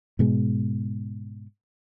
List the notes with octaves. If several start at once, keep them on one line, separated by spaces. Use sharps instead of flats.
G#2 B2 G#3